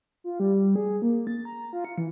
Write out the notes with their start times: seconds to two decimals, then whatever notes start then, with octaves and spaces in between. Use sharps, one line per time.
0.24 F4
0.40 G3
0.76 G#4
1.02 A#3
1.27 A6
1.45 A#5
1.73 F4
1.85 C#7
1.98 E3